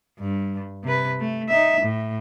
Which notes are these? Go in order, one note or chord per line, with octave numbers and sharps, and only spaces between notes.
G2
C3 B4
A3
D#4 E5
A2